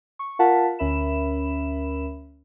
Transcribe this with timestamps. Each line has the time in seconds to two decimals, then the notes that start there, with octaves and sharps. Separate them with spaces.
0.19 C#6
0.39 F4 A#4 F5 F#5 A5 B6
0.79 D2 C#4 A#4 E5 B5 E7